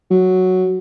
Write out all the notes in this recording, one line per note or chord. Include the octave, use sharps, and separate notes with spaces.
F#3